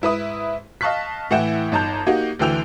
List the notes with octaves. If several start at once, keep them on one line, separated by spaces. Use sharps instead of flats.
G#2 E4 B4 D#6
D#5 F5 A5 C#6 F#6 B6
A2 E3 E4 F#5 G5 E7
G1 D#4 A5 A#5 G6
A#3 D#4 F#4 G4
D2 D3 E3 G5 E6 F7